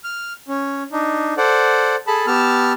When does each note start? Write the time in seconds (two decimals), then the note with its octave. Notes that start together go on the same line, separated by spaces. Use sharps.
0.04 F6
0.48 C#4
0.92 D4 D#4
1.37 A4 C5 D5 F#5
2.07 G#4 A4 A5 B5
2.27 B3 G4 A5 E6 F6